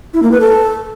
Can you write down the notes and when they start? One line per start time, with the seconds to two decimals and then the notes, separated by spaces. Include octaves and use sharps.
0.14 E4
0.23 A#3
0.31 B4
0.40 A4